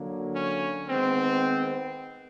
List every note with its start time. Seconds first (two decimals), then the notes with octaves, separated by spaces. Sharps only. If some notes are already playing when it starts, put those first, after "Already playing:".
Already playing: D3 F#3 A#3
0.34 C#4
0.88 D#3 G#3 B3 C4